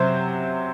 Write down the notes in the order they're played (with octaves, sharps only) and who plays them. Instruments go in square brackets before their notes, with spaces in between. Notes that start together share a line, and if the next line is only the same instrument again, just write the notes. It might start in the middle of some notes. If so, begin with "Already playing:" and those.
Already playing: [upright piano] C3 F#3 C4 C5